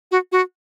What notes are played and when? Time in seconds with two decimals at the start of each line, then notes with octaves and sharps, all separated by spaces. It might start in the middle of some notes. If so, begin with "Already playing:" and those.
0.11 F#4
0.32 F#4